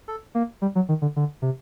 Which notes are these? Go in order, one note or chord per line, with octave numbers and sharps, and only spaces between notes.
A4
A#3
G3
F#3
D#3
D3
D3
C3